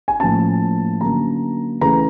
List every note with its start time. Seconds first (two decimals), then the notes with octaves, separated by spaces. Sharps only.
0.08 G#5
0.20 A2 F3 A#3 C#4 A5
1.01 D3 F#3 A#3 C#4 A#5
1.81 C#3 E3 A3 A#5